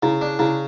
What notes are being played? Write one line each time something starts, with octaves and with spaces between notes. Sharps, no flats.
C#3 E4
D4
C#3 E4